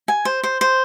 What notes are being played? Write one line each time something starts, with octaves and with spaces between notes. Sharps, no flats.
G#5
C5
C5
C5